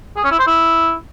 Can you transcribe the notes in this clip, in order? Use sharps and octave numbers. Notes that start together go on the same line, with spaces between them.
G#4
C#4
E4
C5
E4